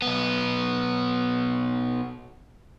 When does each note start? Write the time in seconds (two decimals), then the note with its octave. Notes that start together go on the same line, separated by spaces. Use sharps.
0.02 B1 B3